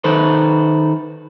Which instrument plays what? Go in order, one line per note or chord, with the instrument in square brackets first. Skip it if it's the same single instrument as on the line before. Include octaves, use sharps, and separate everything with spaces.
[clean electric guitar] D#3 A4 B4 C5